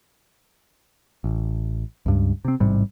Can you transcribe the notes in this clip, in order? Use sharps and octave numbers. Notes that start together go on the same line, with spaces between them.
A1
C#2 G2
C3 C4
A1 G#2 C3 G3